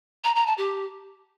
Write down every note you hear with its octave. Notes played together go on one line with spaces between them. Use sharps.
A#5
A#5
A5
G4